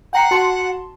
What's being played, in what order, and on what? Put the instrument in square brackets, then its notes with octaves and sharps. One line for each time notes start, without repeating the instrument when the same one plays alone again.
[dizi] F#5 [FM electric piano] G5 A#5 C7
[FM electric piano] F#4 A5 C6